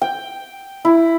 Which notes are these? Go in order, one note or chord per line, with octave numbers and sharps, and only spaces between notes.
G5
E4